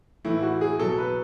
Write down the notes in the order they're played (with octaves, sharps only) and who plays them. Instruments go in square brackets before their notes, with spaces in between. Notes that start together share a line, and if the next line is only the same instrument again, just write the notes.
[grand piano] A2 E3 E4
F#4
G#4
B2 F#3 A4
A4
B4